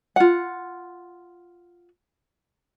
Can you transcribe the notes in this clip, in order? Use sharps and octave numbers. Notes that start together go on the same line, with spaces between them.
F4 F#5